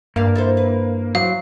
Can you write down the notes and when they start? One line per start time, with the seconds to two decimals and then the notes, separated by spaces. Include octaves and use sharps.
0.16 G2 A#3 D5 F5
0.36 E4 A4 C5
0.57 B4
1.15 E3 F#3 C5 F5